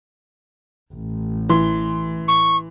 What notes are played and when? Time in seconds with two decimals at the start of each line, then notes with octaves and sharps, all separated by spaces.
0.91 A1
1.49 E3 C6
2.28 C#6